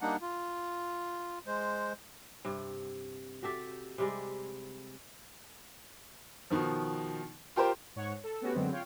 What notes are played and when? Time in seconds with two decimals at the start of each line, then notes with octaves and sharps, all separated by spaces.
0.01 G3 A#3 D4 D#4 F#5
0.21 F4
1.47 G#3 C5
2.45 G2 C3
3.43 F#4 G4 A4 E5
3.98 C3 G3 G#3
6.50 B2 D#3 F3
7.56 F4 G4 A#4 C5
7.96 G#2 C#5 F#5 C#6
8.24 A4
8.41 A3 B3 C#4 F#4 G4
8.54 F#2 D3 F#3 G#3 B3 C4
8.72 F4 C#5 F5 G5